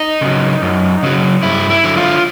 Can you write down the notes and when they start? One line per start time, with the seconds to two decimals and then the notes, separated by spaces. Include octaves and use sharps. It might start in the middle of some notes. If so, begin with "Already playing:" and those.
Already playing: D#4
0.21 C#3 F#3
0.62 F#2
1.03 C#3 F#3
1.43 G2 E4
1.70 E4
1.84 D3 F#3
1.97 F4